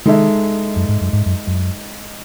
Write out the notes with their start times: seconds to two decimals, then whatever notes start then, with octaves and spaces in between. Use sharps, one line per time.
0.06 D#3 G#3 D#4 A4 E5
0.76 F#2
0.89 G#2
1.01 F#2
1.13 G#2
1.26 F#2
1.47 F#2